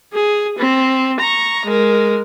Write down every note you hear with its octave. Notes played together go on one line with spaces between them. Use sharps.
G#4
C4
A#5 C#6
G#3 A#4